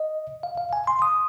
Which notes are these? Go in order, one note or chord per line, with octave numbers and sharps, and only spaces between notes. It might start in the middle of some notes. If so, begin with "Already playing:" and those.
Already playing: D#5
F5
F5
G#5
C6
D#6